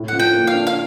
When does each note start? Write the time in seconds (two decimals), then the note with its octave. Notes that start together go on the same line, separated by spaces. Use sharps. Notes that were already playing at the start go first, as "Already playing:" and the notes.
Already playing: A2
0.08 F3 F#5
0.20 G5
0.34 A#3
0.47 F5
0.54 D4
0.67 F5